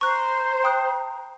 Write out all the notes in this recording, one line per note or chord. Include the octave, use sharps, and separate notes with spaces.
C5 A#5 C#6 F#6
G5 D#6 F#6